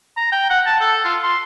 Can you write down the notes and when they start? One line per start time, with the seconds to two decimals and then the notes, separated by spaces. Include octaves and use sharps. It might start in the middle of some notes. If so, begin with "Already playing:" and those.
0.17 A#5
0.32 G5
0.50 F#5
0.66 A5
0.80 A4
1.04 F4
1.23 C6